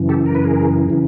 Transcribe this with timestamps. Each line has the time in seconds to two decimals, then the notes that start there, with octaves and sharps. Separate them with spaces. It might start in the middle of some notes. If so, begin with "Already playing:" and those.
Already playing: F#2 C#3 E3
0.09 G4 A4
0.26 A#4
0.35 B4
0.44 G#4 A#4
0.90 C#3 E3